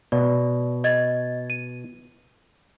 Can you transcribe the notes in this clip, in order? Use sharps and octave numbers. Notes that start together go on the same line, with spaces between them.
B2 D5
D#5 G#6 A6
D#7